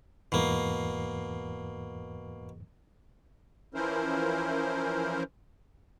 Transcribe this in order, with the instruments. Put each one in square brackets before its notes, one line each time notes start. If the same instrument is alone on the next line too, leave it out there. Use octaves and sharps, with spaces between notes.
[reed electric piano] E2 G#2 E3 [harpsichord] B2 A#3
[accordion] E3 F3 C#4 E4 A#4 C5